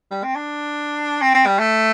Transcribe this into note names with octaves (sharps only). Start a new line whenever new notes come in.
G3
C4
D4
C4
C4
G3
A3